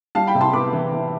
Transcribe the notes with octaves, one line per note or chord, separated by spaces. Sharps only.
G3 F5 A5
G5 B5
C3
A5 C6
B3 B5 D6
E3
E3